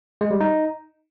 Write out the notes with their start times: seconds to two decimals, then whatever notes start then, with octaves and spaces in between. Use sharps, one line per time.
0.21 G#3
0.31 G3
0.41 D#4